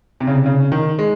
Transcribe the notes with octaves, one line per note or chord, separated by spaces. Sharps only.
C3
C#3
C3
C#3
D#3
G#3